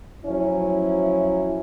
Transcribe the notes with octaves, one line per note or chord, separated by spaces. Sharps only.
F3 F#3 A3 C#4 E4